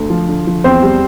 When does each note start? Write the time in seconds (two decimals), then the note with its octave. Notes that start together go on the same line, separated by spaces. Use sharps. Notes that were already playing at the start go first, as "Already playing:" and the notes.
Already playing: D2
0.10 F3
0.29 D3
0.47 F3
0.64 E2 C4 C5
0.82 G3